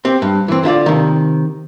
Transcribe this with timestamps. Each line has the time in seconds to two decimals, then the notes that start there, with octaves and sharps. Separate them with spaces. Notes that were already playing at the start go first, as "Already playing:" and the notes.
0.05 C4 G4
0.22 G2
0.48 E3 C4
0.63 D3 E4 F4 D5
0.86 C3 D#3